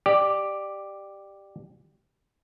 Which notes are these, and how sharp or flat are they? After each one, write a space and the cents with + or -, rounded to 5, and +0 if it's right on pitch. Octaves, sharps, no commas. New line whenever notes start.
G4 +0 D5 +20